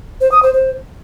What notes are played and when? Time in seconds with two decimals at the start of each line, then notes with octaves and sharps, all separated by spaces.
0.21 C5
0.32 D#6
0.43 C5
0.54 C5